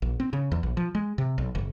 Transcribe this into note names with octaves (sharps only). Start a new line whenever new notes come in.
A#1
C4
C#3
E2
A#1
F3
G#3
C3
B1
F#1